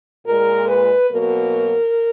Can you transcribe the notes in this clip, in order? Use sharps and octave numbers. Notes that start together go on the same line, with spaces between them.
A#2 G#3 A#4
B4
B2 F#3 A#3 A#4